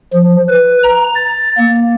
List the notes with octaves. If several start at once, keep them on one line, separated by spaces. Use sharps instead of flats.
F3
B4
A#5
A6
A#3